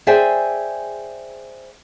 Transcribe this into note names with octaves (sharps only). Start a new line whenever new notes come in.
G#4 C5 D5 E5 G5 G#5